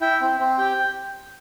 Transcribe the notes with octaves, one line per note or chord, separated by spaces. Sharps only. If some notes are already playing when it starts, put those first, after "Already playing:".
E4 G5
C4
C4
G4 G5